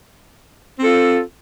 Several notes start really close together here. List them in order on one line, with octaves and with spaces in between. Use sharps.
C4 A4 F4